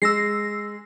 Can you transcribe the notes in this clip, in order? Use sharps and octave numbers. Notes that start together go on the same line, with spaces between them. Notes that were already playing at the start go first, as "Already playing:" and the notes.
G#3 E6 A#6 C7